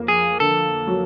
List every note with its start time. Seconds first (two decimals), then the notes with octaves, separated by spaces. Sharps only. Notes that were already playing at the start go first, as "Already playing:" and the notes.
Already playing: F2 A#3
0.08 G#4
0.40 D3 A4
0.87 F#3